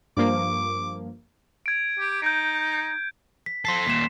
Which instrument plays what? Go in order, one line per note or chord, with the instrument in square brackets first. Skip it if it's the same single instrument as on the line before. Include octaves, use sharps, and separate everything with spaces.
[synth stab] G2 F3 A#3 [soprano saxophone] D6
[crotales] G#6 D7
[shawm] G4
[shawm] D#4 [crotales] G6 D7
[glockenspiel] B6
[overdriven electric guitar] C4 A4 [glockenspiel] C6 B6 C7
[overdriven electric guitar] D#2 A#2 [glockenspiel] B6 C7 E7